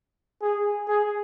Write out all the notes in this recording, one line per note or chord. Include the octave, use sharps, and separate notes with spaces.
G#4
G#4